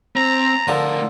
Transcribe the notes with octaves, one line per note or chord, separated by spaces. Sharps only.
C4 A#5
A2 D3 F3 A4 A#4